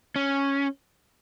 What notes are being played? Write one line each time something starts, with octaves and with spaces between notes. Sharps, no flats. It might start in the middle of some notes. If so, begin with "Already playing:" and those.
C#4